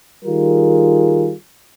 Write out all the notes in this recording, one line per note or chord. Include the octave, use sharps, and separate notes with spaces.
D#3 G3 F4 G#4 A#4